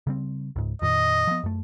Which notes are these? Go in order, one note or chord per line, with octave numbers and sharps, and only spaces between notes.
C#3 G3 C4
C#2 G#2
F2 A#2 D#3 D#5
F3 B3
F#2 A3